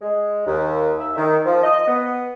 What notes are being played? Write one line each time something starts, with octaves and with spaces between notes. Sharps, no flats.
G#3
D#2
E5
D#3
F3
D#5
B3